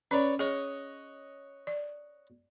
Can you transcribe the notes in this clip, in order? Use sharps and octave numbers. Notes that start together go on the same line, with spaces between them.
C#4 B4 C#5 D5
G#4 C#5 D#5 F#5
D5